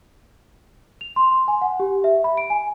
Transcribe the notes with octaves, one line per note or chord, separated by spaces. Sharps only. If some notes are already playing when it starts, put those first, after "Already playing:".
F7
C6
C6
G#5
F#5
G4
E5
B5
D7
G#5